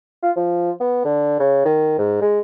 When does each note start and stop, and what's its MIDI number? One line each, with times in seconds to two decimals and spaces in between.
0.23 0.31 65
0.37 0.71 53
0.80 1.04 59
1.05 1.39 50
1.40 1.61 49
1.65 1.95 51
1.99 2.20 44
2.21 2.40 56